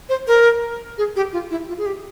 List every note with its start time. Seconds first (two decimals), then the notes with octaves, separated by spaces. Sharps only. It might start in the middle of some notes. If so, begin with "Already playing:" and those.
0.09 C5
0.27 A#4
0.98 G#4
1.16 G4
1.33 F4
1.51 E4
1.68 F4
1.78 G#4
1.86 G4